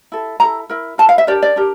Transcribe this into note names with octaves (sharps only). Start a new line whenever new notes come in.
E4 A4
E4 A4 A#5
E4 A#4
E4 A#4 A5
F5
E5
D4 G4 A#4 D5
D5
D4 G4 A#4